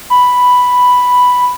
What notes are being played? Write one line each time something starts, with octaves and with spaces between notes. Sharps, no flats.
B5